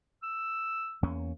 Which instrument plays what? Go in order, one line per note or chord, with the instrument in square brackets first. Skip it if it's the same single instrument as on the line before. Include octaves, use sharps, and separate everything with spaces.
[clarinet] E6
[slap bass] E2 A#3 C#4